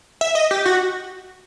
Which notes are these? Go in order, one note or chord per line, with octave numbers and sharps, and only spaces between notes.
E5
D#5
G4
F#4